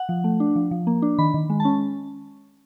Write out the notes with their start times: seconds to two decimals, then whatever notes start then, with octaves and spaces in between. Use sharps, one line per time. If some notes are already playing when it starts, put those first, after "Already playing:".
Already playing: F#5
0.09 F3
0.24 A3
0.40 D4
0.56 F3
0.71 F3
0.87 A#3
1.02 D4
1.18 D#3 B5
1.34 D#3
1.50 G#3
1.60 A5
1.65 C#4